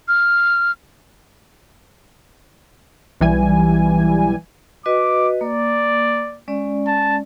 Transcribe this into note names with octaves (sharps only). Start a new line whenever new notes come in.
F6
B1 E3 G3 G#5
F#4 B4 D#5 D6
A#3 D5
G#3 C#4 D5
A5